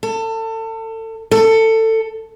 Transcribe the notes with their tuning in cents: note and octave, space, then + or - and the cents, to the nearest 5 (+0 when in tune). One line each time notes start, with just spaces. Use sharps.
A4 +30
A4 +20